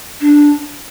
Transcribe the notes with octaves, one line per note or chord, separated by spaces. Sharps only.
D4